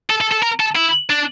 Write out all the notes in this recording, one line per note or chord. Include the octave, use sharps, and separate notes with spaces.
A4
A4
A4
A#4
A4
E4
D4